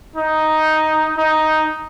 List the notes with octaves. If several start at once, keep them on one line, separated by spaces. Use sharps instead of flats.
D#4
D#4